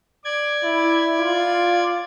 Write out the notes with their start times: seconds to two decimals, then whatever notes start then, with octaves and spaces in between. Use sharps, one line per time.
0.24 D5 G#6
0.63 E4
1.19 F4